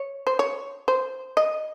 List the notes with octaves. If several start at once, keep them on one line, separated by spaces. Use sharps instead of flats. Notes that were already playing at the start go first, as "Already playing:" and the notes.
Already playing: C#5
C5
C#5
C5
D#5